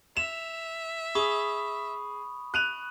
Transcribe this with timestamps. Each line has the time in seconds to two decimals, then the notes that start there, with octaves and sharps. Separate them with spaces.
0.17 E5 E7 F7
1.15 G#4 B5 C#6 D#6
2.54 F#6 D#7 F7